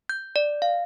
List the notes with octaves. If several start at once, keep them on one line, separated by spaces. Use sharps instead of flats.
G6
D5
F5